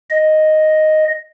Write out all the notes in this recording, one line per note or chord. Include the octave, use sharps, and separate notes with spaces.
D#5